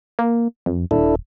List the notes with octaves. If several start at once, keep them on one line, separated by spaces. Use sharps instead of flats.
A#3
F2
D#1 D4 E4 A4